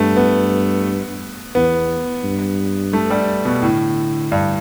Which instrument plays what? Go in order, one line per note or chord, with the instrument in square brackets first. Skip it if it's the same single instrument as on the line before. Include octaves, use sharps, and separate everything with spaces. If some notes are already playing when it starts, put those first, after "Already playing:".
Already playing: [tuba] G2 [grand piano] A3 B3
[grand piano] B3
[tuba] E2 [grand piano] B3
[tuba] G2
[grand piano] A3
G3
B2
[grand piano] A2 [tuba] D3
[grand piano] G2